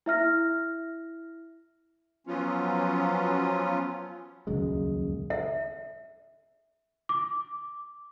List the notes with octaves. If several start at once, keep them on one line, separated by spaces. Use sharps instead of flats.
E4 E5 F6 A#6
F3 F#3 B3 C#4 F4
D#1 C#2 F#2 G#3
E5
D6